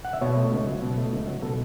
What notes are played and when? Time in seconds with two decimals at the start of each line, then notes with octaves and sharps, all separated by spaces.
0.05 F#5
0.13 E5
0.21 B2 C#5
0.37 A3
0.52 C#2
0.67 F#3
0.82 B2
0.98 A3
1.13 C#2
1.27 F#3
1.42 B2 A4